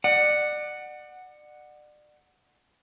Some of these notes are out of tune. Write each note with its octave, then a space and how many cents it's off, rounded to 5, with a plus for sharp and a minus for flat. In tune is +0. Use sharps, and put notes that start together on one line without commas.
D5 +35 F#5 +0